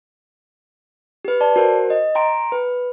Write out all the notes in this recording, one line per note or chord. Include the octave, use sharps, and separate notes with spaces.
G4 B4
D5 A5
F#4 A#4 C5
D#5
G5 A#5 C6 D7
B4